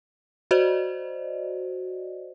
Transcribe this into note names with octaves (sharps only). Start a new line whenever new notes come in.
F#4 C5 D5 D#5